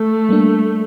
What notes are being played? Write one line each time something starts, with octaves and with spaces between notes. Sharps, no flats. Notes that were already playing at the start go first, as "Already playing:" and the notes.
Already playing: A3
G3 A#3 D4